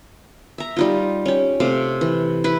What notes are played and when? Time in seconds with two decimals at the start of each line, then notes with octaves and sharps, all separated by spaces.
0.58 E5 A#5
0.76 G3 D#4 F4
1.26 C#4 G4
1.60 C3 A3 F5 D6
2.01 E3
2.44 E4 B4 B5